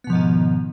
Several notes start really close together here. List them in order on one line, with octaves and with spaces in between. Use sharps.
B3 B2 F3 G#2 D#3